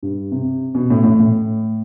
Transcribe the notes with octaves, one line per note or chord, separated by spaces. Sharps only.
G2
C3
B2
A2
A2
A2